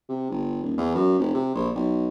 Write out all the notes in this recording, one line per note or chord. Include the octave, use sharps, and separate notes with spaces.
C3
G1
D#1
E2
F#2
F1
C3
A#1
B1